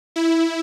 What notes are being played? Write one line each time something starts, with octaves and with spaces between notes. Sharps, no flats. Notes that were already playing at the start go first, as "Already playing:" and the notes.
E4